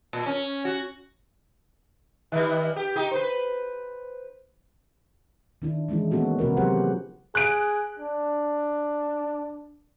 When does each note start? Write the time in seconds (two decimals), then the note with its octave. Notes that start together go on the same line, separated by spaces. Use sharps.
0.13 A#2
0.26 C#4
0.65 F#4
2.32 D#3 G3
2.76 G4
2.96 D#4 G4
3.11 B4 C5
5.62 D#3 D4 E4
5.89 E3 F3 G#3 C#4 E4
6.11 F3 A#3 B3 C#4 F#4 A4
6.39 C3 F#4 A#4 B4
6.57 F3 F#3 G4 G#4 C5 F#5
7.35 G#4 F#6 D7
7.99 D4